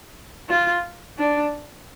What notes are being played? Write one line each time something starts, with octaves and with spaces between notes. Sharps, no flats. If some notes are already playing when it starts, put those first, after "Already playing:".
F4
D4